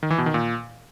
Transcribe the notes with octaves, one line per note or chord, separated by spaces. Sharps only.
D#3
E3
B2
D#3
A#2